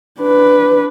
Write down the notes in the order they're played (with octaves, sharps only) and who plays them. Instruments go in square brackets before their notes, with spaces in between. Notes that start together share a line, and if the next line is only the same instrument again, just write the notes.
[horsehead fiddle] D4 B4